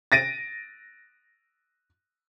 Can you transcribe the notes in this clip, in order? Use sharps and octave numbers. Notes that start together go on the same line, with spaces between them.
A6 A#6 D7 D#7